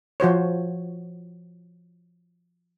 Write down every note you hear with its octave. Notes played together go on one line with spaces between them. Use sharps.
F3 F#4 C5 C#5